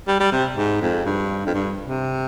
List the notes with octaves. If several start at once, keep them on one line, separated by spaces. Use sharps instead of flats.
G3
G3
C3
G#2
F2
G2
F2
G2
C3